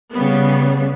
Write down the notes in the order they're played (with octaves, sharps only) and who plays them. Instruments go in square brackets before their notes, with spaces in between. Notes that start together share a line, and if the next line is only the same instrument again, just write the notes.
[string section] C#3 G3 B3